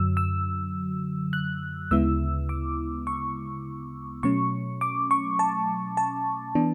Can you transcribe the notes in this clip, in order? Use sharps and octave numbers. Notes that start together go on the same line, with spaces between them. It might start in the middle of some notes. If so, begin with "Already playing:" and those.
Already playing: F#2 D3 F#3 E6
E6
F#6
D2 C#3 G#3 B3 E4 E6
D6
C#6
B2 F#3 A3 C#4 C#6
D6
C#6
A5
A5
E3 B3 D4